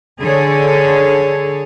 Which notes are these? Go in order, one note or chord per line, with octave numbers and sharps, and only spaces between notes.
D3 G#4 A4 C#5